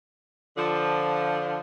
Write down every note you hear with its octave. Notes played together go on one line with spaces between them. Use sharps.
D3 F3